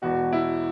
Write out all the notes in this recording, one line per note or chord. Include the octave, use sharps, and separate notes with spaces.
E1 E2 B2 F#4
E4